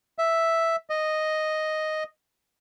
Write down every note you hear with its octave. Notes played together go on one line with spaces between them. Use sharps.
E5
D#5